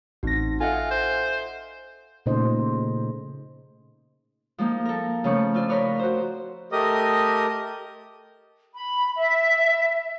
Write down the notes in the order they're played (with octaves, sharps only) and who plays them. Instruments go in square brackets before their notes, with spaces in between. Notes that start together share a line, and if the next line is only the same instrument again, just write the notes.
[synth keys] A1 A#6 [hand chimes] C4 D#4 F#4
[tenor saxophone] F4 [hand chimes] A4 D#5 E5 [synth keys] F#5 G#5
[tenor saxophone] C5
[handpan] A#2 C#3 A3 D#4 C5 D#5
[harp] F3 G#3 A#3 D#4
A4 A#4
C#3 F3 A3 C#6
C4 F4 D5
D#4 A#4 B4 C#5 D5
F#4 C5
[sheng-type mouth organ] A3 G4 A#4 D#5 D#6
[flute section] B5
E5